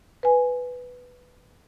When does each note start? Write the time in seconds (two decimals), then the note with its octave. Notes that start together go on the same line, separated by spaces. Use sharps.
0.23 B4 G#5